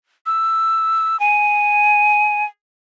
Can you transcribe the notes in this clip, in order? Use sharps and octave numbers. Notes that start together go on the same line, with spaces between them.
E6
G#5